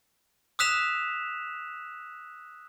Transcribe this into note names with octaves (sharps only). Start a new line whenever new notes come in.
D#6 E6 F#6 B6 E7 F7